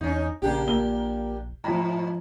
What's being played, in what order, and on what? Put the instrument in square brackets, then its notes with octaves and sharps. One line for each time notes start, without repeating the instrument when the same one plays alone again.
[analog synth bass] E2 [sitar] C#4 D#4
[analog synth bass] A#1 [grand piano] C#3 [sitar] A#3 D4 G4
[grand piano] A#2 G7
[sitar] G#2 [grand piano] F3 A#5